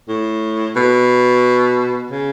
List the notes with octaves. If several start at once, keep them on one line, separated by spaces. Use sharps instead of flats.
A2
B2
C#3